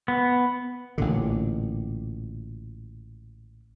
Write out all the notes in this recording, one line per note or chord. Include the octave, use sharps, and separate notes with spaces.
B3
A1 A#2 D3